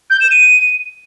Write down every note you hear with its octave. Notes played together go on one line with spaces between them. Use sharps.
G6
E7
D#7